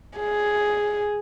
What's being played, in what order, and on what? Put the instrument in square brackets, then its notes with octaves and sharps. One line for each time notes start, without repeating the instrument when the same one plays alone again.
[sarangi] G#4